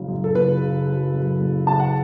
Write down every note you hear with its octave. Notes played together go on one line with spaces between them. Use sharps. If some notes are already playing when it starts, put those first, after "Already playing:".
Already playing: F#1 C#3 F#3
F#2
A4
F#1 B4
C#3
F#3
F#2
F#1
C#3 A5
F#5